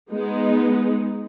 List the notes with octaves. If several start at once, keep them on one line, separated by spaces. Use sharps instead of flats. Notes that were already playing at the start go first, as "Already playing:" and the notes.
G#3 B3 D#4